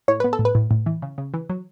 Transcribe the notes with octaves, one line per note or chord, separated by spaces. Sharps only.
A2 C#5
B3 B4
A4
A2
B4
A2
A2
E3
C#3
C#3
E3
F#3